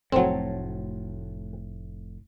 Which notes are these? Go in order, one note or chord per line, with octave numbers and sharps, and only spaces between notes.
F1 A2 F#3 C4 F#4 A4 C#5